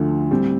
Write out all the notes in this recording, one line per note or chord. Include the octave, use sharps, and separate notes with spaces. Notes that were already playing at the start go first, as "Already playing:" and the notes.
Already playing: D2 D3 F3 A3
A2 G3 C4